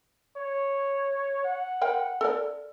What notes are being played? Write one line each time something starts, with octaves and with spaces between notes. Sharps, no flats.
C#5
F#5
A#4 F5 G5
A4 A#4 D5